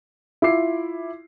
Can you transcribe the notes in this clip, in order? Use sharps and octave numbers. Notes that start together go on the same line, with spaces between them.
E4 F4 D6 C7